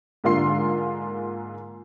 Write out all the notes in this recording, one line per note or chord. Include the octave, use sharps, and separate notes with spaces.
G#2 D3 A#3 F4 C6 C7